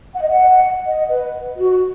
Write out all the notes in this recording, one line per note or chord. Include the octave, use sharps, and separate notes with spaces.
F#5
D#5
F#5
D#5
B4
F#4